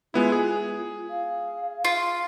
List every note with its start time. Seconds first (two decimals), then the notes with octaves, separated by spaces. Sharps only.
0.14 G#3 B3 E4 F4
0.32 G#4
1.10 F5
1.85 F4